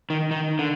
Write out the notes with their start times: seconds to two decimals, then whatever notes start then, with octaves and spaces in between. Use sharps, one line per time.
0.10 D#3
0.31 D#3
0.59 D3